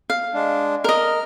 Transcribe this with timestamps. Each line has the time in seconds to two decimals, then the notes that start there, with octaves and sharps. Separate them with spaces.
0.10 F5
0.34 G#3 D4
0.84 A#4 D#5 F6